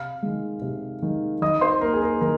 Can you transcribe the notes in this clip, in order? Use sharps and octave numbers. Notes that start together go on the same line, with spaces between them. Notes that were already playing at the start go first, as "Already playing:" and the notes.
Already playing: C3 F5 F6
D#3 G#3
C3
D#3 G#3
D#3 D#5 D#6
C5 C6
A#3 A#4
G#4
A#4
D#3 A#4